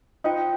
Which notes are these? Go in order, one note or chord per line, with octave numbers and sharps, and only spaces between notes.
D#4 F4 C5 G5